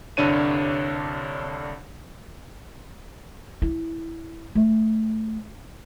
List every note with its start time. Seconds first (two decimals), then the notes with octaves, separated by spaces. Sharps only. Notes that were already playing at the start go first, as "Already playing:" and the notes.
0.17 C2 G2 D3 D4 C#5 D#7
3.62 E4
4.55 A3